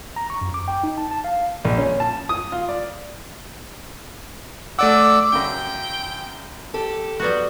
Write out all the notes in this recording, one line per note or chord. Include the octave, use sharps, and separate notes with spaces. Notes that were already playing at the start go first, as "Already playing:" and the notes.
A#5
C#6
F#2
D6
G5
D#4
A5
A5
F5
A#1
C#4
A5
D#6
F4
D5
A3 D5 F#5 D6 E6
F#2 C#3 G5
G4 A4
G3 B3 F#4